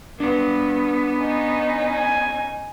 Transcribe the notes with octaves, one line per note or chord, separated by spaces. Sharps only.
B3 D4 B4
C#4 D#4
G#5